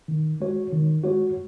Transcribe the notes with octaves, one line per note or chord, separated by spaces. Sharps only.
D#3
G#3 F#4 C#5
D#3
G#3 F#4 C#5